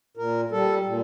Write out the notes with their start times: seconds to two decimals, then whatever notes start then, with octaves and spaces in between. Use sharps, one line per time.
0.17 A#2 A#4
0.51 G3 A4
0.86 A#2